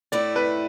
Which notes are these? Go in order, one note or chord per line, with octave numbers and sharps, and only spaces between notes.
A2 A3 E4 D5
B4